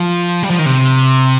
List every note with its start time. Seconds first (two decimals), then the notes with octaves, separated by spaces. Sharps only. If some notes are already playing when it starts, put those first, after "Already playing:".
Already playing: F3
0.43 G3
0.50 F3
0.59 D#3
0.66 C3